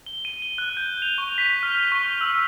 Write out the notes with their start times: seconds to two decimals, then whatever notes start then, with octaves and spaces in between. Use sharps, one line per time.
0.06 G7
0.25 D#7
0.42 G7
0.58 F#6
0.77 G6
1.02 F7
1.18 C#6
1.38 B6
1.63 F6
1.92 C#6
2.21 E6